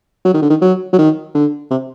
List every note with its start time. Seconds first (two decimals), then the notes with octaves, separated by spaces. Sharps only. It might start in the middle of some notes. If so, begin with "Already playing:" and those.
0.25 F#3
0.34 D#3
0.42 D3
0.50 D#3
0.62 F#3
0.93 F#3
0.98 D#3
1.35 D3
1.71 C3